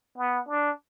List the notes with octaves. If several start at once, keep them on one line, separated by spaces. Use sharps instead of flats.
B3
D4